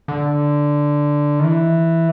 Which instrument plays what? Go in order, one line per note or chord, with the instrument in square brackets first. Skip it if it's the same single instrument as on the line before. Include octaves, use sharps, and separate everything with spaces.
[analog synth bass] D3
D#3
E3